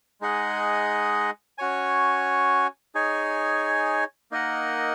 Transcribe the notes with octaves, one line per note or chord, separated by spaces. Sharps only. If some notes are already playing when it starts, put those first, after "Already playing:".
G#3 D#4 G#4 D#5 F#5
C#4 F#4 C#5 G#5
D#4 G#4 C#5 G#5
A#3 D#4 A#4 D#5 F#5